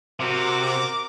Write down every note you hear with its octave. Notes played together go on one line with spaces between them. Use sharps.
C3 F#4 A#4 D6